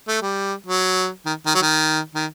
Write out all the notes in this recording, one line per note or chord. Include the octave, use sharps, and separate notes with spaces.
A3
G3
F#3
D#3
D#3
F#3
D#3
D#3